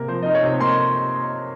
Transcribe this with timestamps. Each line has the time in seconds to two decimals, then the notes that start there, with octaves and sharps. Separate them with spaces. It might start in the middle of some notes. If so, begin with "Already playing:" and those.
Already playing: C3 A#3 A#4
0.08 F3 C5
0.23 D#4 D#5
0.35 C#5
0.43 C3
0.60 A#3 C6